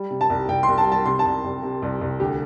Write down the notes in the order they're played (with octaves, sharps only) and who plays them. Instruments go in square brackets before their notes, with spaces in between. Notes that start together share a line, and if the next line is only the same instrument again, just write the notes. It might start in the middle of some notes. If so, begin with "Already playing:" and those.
Already playing: [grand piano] G3
C3
A5
C2
C2 G5
C6
C2
A5
G3
A5
C3 C6
A5
C2
C2
C3
C2
C2
D2 G4